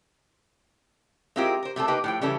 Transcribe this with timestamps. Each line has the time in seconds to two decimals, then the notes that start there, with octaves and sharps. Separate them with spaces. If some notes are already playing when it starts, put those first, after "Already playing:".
1.36 G#3 C4 E4 F4 G4 A#4
1.63 A#4 C5
1.76 C3 A3 C4 A4
1.88 A#3 D#4 G4 B4
2.04 A2 F3 G5
2.21 C#3 E3 G3 C#4 A4